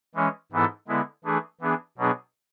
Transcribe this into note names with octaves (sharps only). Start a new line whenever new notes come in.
E3 G#3 C#4
G#2 E3 B3 E4 A4
D3 G#3 B3 E4
E3 A3 D4 G#4
E3 B3 D4 G#4
B2 F#3 B3 D4 G#4